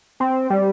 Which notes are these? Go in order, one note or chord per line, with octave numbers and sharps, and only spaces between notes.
C4
G3